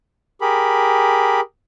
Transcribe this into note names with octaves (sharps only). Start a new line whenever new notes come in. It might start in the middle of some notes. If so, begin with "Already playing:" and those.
G4 G#4 A#4 B5